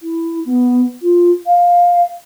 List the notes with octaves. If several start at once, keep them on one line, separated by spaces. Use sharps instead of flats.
E4
B3
F4
F5